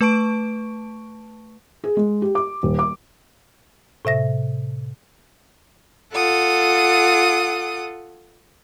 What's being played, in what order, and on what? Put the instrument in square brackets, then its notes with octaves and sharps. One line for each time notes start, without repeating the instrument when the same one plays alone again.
[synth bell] A3 B4 A5 C#6 D7
[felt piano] G#4
G#3
G4
D6
D#1
D6
[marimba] A2 C3 E5 A#6
[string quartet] F4 A4 F#5 D#6